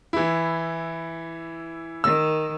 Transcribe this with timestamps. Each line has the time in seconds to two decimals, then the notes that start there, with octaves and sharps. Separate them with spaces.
0.13 E3 E4
2.04 D#3 E6